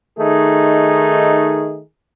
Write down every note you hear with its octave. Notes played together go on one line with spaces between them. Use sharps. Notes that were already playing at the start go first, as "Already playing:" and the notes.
D#3 A3 D#4 G#4